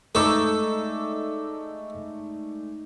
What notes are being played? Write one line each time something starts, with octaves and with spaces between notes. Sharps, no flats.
G#3 A3 D#4 A4 D5 C#6